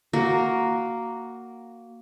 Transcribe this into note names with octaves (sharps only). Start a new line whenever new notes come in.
A#3 F#4 A#4